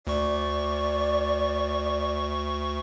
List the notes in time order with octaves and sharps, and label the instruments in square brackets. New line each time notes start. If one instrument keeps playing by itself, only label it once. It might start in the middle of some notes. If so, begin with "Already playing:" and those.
[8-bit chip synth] D2 C#6 [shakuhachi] D5